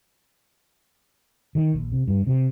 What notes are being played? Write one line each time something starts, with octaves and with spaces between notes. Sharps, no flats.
D#3
A#1
C3
G2
C3